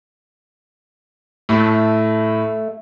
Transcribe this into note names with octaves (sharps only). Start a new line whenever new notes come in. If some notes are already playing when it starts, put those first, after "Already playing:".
A2 A3